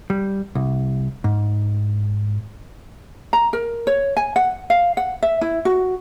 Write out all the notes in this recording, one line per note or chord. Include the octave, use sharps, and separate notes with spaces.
G3
C2
G#2
A#5
A#4
C#5
G#5
F#5
F5
F#5
E5
E4
F#4